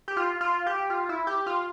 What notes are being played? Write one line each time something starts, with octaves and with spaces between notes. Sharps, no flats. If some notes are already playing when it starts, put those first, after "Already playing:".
G4
F4
F4
G4
F4
E4
G4
F4